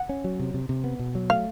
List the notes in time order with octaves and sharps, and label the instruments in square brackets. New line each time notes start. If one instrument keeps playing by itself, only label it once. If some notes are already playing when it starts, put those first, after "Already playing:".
Already playing: [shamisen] F#5
[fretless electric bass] C#4
F#3
C3
C3
C3
B3
B2
F#3
[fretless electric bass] A3 [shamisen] F5